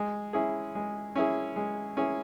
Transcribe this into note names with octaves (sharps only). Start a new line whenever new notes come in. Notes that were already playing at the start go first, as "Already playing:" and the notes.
Already playing: G#3
C#4 E4 G#4
G#3
C#4 E4 G#4
G#3
C#4 E4 G#4